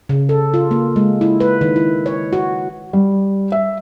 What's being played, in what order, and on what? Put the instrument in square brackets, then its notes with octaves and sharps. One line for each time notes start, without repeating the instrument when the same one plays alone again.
[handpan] C#3
A4
F4
A#3
G#3
E4
B4
D#3
E4
C#5
F#4
[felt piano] G3
E5